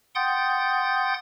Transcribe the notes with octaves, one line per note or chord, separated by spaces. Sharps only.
F#5 G5 C6 D#6 G6 A6